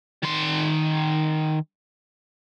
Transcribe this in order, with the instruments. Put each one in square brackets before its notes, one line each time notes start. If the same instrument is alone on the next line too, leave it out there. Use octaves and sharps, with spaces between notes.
[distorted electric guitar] D#3 C6